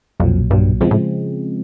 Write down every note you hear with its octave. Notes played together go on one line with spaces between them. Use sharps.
B1 F2 A#2 F#3
B1 G2 A#2 F#3
F2 C#3 F3 G#3 C4
A2